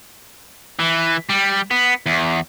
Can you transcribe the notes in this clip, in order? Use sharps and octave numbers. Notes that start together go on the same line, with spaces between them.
E3
G3
B3
E2